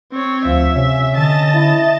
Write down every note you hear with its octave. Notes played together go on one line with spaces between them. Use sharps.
C4 C#5
D2 F3 E5
C3 C#4
D3 D#5 A5
E4